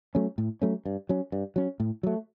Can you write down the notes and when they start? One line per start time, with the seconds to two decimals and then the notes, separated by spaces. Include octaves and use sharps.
0.15 F#3 A3 C#4
0.38 A2
0.62 F#3 A3 C#4
0.85 G2
1.09 F#3 C#4
1.32 G2
1.56 F#3 C#4
1.80 A2
2.03 F#3 A3